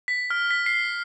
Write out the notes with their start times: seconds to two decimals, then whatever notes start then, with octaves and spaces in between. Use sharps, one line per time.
0.08 B6
0.30 F6
0.51 B6
0.66 C7